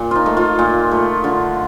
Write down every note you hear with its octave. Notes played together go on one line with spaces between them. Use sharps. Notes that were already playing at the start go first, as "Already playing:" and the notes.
Already playing: A#2
D#4 F4
A3
F4
A#2
A3
D3